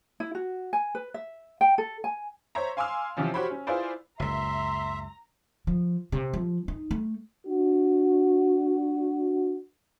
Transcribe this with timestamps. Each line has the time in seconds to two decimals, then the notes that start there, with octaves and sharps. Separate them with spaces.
0.20 E4
0.35 F#4
0.73 G#5
0.95 B4
1.14 E5
1.61 G5
1.78 A4
2.04 G#5
2.55 C5 C#5 E5 A#5
2.77 F5 G#5 C6 D6 E6 F6
3.17 C3 E3 F3 C#4
3.34 F#4 G4 C5 C#5 B5
3.50 C#4
3.67 E4 F4 G#4 B4 C5 D5
4.20 F#1 C#2 E5 A#5 C6
5.67 F3
6.12 C3
6.33 F3
6.68 D#4
6.91 A3
7.46 D4 F#4